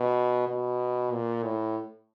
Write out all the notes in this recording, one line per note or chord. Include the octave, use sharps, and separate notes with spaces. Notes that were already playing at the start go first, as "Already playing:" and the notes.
Already playing: B2
B2
A#2
A2